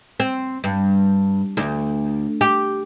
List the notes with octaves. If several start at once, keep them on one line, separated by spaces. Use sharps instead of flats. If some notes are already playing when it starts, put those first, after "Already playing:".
C4
G2
D2
G4